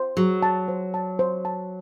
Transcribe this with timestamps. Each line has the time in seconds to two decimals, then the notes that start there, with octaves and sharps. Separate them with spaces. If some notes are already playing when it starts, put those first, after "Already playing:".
Already playing: C5
0.17 F#3 G#4
0.42 A5
0.68 C5
0.94 A5
1.19 C5
1.45 A5